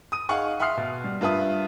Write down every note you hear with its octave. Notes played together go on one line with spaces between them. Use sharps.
D#6 D#7
D#4 G#4 F5 F#5 C#6
E5 F#5 C6 D#6 F6 C7
B2
G3
G2 F4 B4 E5 D#6